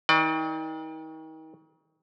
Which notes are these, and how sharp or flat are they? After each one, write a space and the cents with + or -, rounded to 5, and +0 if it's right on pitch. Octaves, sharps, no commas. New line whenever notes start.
D#3 +35 D5 +35